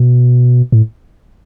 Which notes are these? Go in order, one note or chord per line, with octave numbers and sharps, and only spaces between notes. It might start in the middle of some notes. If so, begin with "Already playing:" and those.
Already playing: B2
A2